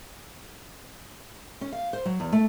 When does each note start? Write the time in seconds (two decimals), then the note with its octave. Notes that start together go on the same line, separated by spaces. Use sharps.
1.61 C#4
1.72 F5
1.93 C5
2.05 F#3
2.20 E2
2.32 A3